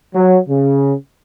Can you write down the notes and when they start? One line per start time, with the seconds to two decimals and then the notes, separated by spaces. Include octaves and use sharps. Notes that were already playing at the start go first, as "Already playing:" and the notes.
0.15 F#3
0.47 C#3